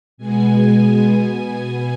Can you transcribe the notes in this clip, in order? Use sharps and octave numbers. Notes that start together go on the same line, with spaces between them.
B2 G#3 B3 G#5
B2 B3